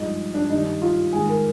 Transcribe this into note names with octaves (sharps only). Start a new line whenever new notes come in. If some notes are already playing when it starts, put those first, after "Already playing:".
Already playing: G2 F3 G#3 D#4
D4
G2 D#3 G3 D#4
F4
G#2 D#3 G#3 G#4
A#4